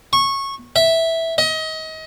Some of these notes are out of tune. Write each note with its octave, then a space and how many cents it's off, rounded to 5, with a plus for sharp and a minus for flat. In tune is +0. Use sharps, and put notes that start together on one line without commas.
C#6 -15
E5 -5
D#5 +30